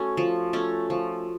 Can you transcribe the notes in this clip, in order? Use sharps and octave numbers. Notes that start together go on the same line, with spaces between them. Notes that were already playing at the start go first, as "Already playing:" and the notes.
Already playing: A3 C#4 F#4
F3
A3 C#4
F3